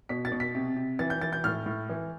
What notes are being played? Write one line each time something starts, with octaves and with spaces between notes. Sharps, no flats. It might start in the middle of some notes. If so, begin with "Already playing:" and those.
B2 B6
A6
B2
B6
C3
C3
E3 A6
G6
E3 A6
G6
A2 F6
A2
E3